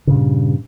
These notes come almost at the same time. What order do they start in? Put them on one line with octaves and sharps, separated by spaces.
C#3 A#2 G2